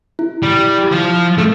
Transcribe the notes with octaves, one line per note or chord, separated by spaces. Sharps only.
E4
G3
F3
A3